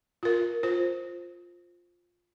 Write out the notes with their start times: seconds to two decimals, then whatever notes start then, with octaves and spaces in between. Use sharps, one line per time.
0.23 F4 A#4
0.63 F4 C5